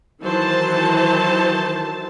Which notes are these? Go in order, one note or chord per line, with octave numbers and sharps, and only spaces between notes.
D#3 E3 F#3 C5 A5